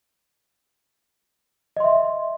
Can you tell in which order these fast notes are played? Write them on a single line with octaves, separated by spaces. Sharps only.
D#5 C6 E5